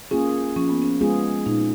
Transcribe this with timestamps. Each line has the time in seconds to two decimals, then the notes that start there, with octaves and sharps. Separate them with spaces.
0.11 A#3 C#4 F4 G#4
0.56 F3 C#4
0.69 B3
0.82 C#4
1.01 G#3 B3 F4 G#4
1.46 A#2 D#4